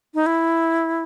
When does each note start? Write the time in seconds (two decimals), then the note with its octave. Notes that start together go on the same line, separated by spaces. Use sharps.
0.14 D#4
0.26 E4